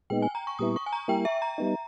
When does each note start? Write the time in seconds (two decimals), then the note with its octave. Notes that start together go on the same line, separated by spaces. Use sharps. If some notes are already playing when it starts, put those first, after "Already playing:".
0.10 A#2 G#3 B3 D#4 G5
0.22 G#5
0.35 A#5
0.47 C#6
0.59 A#2 G3 B3 E4 D#6
0.76 C#6
0.86 G#5
0.93 A#5
1.08 G3 A#3 E4 G5
1.25 E5
1.42 A#5
1.58 G3 B3 D#4